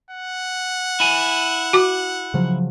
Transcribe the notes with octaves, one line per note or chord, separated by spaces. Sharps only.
F#5
E4 G#5
F#4 D6
C#3 F3 F#3